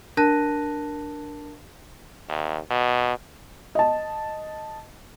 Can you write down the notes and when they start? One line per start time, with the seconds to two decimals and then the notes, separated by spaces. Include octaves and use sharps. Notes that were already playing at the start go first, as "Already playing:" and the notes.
0.17 D4 A#4 A5 F#6 A#6 D#7
2.28 D#2
2.70 B2
3.75 D#5 A5